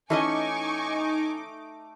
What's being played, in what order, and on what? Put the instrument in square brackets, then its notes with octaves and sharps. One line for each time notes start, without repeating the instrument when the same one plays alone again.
[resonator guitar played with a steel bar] E3 C#4 D#5 [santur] A3 [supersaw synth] D#4 D6 [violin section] G#5 C#6